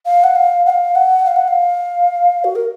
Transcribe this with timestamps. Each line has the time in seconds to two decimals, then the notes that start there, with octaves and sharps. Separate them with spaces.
0.06 F5
0.24 F#5
0.35 F5
0.66 F#5
0.70 F5
0.95 F#5
1.25 F5
1.36 F#5
1.48 F5
2.44 F#4
2.56 A#4